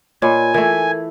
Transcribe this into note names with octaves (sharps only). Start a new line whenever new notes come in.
A#2 C#5 D#5 G#5 B5
E3 A3 A#4 G#6